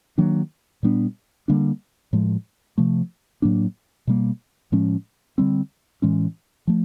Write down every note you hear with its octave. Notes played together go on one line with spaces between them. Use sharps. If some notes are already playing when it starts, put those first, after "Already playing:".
D#3 F#3 A#3 D4
A#2 G3 B3 D4
D3 G3 A#3 D4
A2 F3 G#3
C3 F3 A3
A2 F#3 A#3 D4
B2 G3 A#3
A2 F3 G#3 C#4
D3 G3 C4
A2 E3 G#3 C#4
F3 A3